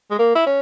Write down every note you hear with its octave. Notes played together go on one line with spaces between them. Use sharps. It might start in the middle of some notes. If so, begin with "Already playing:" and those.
G#3
A#3
E4
C#4